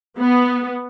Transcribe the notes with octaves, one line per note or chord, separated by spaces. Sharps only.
B3